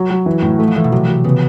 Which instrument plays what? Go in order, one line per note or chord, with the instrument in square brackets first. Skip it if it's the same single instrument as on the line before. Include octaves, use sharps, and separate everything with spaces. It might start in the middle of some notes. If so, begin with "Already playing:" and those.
Already playing: [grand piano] F#3
F#3
E3
A2
[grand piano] A3 [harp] B3
[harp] F3
[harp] E3 [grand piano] A3
[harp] B2
[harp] C3 [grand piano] F#3
[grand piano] F#3
[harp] C#3 [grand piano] B3